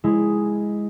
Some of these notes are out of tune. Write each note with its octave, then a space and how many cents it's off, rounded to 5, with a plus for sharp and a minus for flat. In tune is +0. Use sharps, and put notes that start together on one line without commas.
G#3 +0 E4 +0